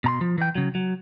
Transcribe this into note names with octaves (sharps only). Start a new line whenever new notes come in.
B2 A#5 C6
F3
E3 G5
C#3 F#3
F#3